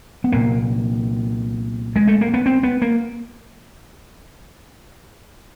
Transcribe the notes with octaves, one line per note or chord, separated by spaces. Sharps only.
B3
C2 A#2 A#3
G#3
A3
A#3
B3
C4
B3
A#3